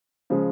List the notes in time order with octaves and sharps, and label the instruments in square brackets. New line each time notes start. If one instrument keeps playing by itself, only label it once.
[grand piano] C#3 F3 G#3